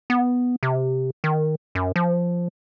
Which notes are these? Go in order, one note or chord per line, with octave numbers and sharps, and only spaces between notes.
B3
C3
D#3
F#2
F3